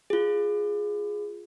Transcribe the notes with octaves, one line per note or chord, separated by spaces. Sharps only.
F4 G#4